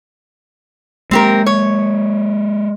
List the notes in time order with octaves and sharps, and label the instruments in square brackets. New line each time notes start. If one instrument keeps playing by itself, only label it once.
[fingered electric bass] G#3 A#3 [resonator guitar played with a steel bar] C4 G4 A#4
[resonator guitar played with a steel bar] C#5